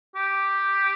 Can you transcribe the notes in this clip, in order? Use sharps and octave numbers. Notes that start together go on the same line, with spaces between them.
G4